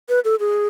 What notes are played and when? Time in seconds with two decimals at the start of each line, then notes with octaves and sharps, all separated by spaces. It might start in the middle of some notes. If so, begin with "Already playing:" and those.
0.09 B4
0.25 A4
0.40 G#4